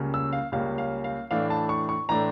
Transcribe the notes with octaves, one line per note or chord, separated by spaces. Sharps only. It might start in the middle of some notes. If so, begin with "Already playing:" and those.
Already playing: C#2 C#3 G3 A#3 C#4
E6
F5
C#2 C#3 G3 A#3 C#4 F5
F5
F5
A2 E3 A3 D4 F5
A5
C#6
C#6
A2 E3 A3 D4 A#5